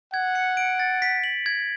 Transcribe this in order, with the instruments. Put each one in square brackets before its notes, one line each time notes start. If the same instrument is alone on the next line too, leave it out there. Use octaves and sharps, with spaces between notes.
[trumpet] F#5 [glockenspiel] G#6
[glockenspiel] C#7
D7
A6
B6
F#7
G#6